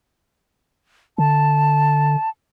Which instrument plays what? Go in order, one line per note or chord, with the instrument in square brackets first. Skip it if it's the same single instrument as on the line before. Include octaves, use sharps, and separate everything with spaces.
[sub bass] D3 [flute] A5